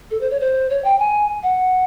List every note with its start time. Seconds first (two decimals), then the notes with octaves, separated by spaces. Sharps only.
0.11 A4
0.21 C5
0.30 C#5
0.40 C5
0.70 C#5
0.84 G5
0.99 G#5
1.43 F#5